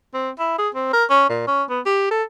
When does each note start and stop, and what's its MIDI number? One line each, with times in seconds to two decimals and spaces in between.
0.14 0.30 60
0.39 0.54 64
0.59 0.69 68
0.75 0.90 60
0.93 1.05 70
1.10 1.29 61
1.29 1.45 46
1.47 1.64 61
1.70 1.80 59
1.86 2.10 67
2.11 2.23 69